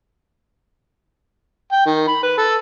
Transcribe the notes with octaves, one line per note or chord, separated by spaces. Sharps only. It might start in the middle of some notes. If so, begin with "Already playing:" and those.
G5
D#3
B5
B4
A4